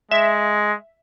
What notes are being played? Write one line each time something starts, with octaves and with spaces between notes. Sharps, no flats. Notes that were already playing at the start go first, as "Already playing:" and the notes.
G#3 E5